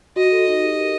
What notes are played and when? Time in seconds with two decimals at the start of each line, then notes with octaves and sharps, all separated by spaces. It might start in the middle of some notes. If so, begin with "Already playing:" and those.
0.16 F#4 D#5
0.32 A4
0.47 D#4
0.63 G4
0.78 A#4